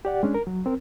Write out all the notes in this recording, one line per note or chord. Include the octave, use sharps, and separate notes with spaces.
G4 D5 F#5
G#3 C#4 D4
A#4
F#3
C4 A#4